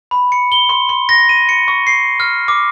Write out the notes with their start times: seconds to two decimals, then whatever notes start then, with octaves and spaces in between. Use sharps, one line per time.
0.11 B5
0.32 C#7
0.52 G7
0.69 C6
0.89 C6
1.09 A#6
1.29 D#7
1.49 C#7
1.68 C#6
1.87 C7
2.20 F6
2.48 D6